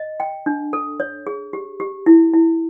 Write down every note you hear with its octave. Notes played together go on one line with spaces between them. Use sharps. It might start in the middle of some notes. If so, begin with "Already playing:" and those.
Already playing: D#5
G5
D4
A4
C#5
G#4
G4
G4
E4
E4